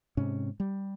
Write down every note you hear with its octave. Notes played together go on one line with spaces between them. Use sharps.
G#2 C3 C#4
G3